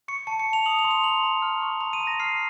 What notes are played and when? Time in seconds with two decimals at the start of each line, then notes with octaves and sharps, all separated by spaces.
0.08 C#6 C#7
0.27 A5 C#7
0.39 C#7
0.46 A5
0.53 F7
0.66 D#6 F#7
0.79 F7
0.85 C6
0.91 F7
1.04 A#5 F#7
1.23 A#5
1.42 F6
1.62 C#6
1.81 A#5 F7
1.93 D#7
2.00 A#5
2.07 A#6
2.20 F6 C7